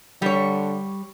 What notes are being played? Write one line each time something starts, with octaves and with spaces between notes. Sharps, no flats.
D3 G3 C#5